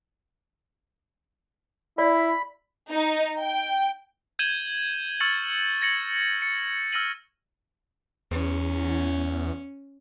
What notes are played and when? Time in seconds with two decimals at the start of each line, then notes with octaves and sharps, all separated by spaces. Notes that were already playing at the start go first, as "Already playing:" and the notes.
1.98 E4 D5 B5
2.91 D#4
3.42 G5
4.39 G6 G#6 D#7 E7 F#7 G7
5.20 C#6 E6 F6 A6 C#7 F#7
5.81 G#6 A#6 C#7 F#7
6.42 A6 C#7
6.92 E6 F6 A#6 C#7 D#7 F#7
8.31 E2 C#4